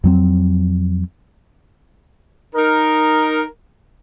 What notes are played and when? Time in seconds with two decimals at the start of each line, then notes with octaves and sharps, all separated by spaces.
0.04 F2 F#3 C4
2.55 D#4 A#4